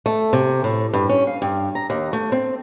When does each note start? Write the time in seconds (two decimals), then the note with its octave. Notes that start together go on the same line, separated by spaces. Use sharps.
0.06 A3
0.33 C3
0.64 A2
0.93 G2
1.09 C#4
1.27 F5
1.42 G2
1.75 A#5
1.90 D#2
2.13 A3
2.32 C4